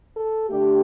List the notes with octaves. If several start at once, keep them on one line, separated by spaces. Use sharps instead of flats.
A4
D3 A3 D4 G4